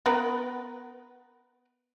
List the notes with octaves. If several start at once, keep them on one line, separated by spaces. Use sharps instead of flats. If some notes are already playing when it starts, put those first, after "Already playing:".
B3 A#4 B4